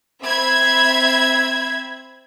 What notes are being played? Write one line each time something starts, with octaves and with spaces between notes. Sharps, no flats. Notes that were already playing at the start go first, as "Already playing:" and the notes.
C4 E5 B5 G#6